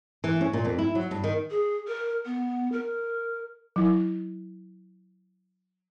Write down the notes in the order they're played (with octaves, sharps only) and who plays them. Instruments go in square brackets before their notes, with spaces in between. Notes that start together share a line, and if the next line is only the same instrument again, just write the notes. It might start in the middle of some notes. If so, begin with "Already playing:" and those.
[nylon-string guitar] E3
C#4
A#2
F2
E4
F#3
G2
D#3
[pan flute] G#4
A#4
B3
A#4
[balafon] F#3 E4